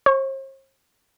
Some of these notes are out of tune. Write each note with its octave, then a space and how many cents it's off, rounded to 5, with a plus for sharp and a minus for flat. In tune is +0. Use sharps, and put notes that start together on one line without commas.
C5 +45 C#6 +0